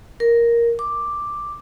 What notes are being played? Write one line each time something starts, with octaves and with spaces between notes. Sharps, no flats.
A#4
D6